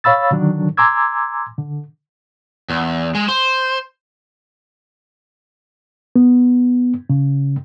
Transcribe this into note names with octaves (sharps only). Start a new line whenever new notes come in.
C#5 F5 B5 E6 A6
D3 D#3 F#3 D4
G#5 A#5 C6 D6 E6 G#6
D3
E2
G#3
C5
B3
C#3